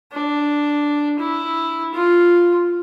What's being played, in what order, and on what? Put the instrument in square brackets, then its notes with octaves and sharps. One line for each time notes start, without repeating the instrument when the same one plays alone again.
[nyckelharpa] D4
E4
F4